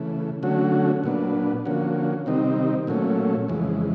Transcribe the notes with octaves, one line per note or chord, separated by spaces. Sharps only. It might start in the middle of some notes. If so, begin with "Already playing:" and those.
Already playing: C#3 E3 A3
D3 F#3 A3 C#4 F#4
A#2 F#3 B3 D4
D3 F3 A#3 C#4 F#4
C3 D#3 G3 C4 D#4
A#2 F#3 A3 C#4
F2 C#3 E3 G#3